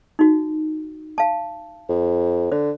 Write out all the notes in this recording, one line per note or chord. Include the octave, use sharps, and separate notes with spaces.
D#4 F#4
F5 A5
F2
D3 C5